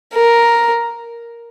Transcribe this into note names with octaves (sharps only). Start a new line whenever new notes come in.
A#4